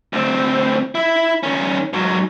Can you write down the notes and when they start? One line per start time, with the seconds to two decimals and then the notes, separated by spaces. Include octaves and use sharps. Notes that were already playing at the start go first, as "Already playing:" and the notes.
0.13 D2 C4
0.95 E4
1.43 D#3 C#4
1.93 G#2 F#3